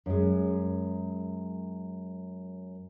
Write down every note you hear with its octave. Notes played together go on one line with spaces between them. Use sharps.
F#2 G#3